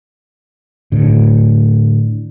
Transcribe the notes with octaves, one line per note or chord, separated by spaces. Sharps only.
A2 D3